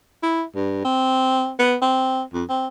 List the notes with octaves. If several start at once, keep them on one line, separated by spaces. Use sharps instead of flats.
E4
G2
C4
B3
C4
F2
C4